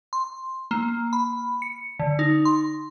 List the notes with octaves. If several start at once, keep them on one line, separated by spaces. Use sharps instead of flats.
C6
A#3
B5
C#7
D3
D#4
C6